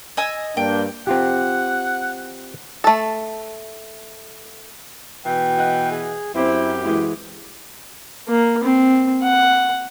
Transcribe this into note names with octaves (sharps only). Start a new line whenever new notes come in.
D#5 G#5 E6
G2 A#3 D4 G5
C4 F4 G4 F#5
A3 A4
B2 E3 G5
D#5 F#5 F#6
G#4
F#2 C4 E4 G4 C5
E3 G#3 E4 F#4
A#3
C4
F#5